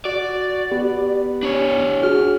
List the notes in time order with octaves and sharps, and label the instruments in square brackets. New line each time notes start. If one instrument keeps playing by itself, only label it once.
[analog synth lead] F#4 [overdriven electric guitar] D5
[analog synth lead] B3 [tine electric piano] G4
[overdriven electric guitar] D4 C#5
[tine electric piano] F#4 G#4 [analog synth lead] F6